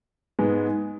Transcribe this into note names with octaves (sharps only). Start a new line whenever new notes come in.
G#2 G#3 B3